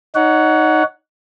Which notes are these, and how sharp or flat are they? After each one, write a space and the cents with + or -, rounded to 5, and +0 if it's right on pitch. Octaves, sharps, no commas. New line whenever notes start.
D#4 +0 C#5 +25 F#5 +0